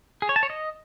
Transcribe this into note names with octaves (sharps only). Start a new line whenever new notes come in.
G#4
C#5
A5
C#5
D#5